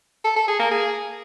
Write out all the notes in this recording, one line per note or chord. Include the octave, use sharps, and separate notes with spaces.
A4
A4
G#4
A#3
G#4